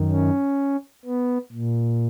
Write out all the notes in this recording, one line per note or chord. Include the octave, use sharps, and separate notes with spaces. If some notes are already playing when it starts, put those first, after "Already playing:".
Already playing: F#2 D#3
C#4
B3
A#2